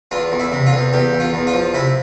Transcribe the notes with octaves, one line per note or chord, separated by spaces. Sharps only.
E2 F4
E2
E4
C3
F4
E2
E2 G4
E2
F4
E2
F4
F3
C3 E4